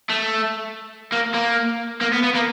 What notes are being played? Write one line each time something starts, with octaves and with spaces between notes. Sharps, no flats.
A3
A#3
A#3
A#3
B3
B3
A#3